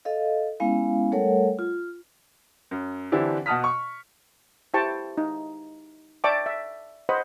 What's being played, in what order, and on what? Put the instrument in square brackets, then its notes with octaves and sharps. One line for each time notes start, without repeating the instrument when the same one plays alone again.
[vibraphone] A4 D#5 F5
G#3 B3 C#4 E4 F5
G3 A3 A4 A#4 C#5 F#5
F4
[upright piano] F#2
D3 E3 C4 D4 E4 G4
B2 F#5 A5 D#6 F6 B6
C#6
[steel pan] E4 G4 C5 G5 A5 C#6
D#4
D5 E5 G5 A5 C#6 D6
E5
C5 D#5 F#5 B5